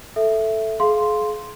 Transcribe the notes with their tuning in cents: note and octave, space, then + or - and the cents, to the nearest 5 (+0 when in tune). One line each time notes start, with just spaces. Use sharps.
A4 +0 E5 +0
G#4 +35 F5 +0 C6 +0